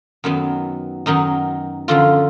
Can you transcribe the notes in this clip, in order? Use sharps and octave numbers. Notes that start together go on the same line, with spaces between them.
F#2 D#3 F#3 B3
F#2 D#3 F#3 D#4
F#2 D3 F3 F4